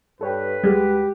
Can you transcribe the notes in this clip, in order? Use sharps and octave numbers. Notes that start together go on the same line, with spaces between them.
G2 A4 B4 C#5 G5
C#2 G3 G#3 F#4 G4